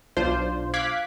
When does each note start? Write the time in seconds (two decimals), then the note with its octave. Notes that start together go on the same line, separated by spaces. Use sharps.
0.17 B1 D4 F4 C5
0.74 F5 D6 F#6 G#6 B6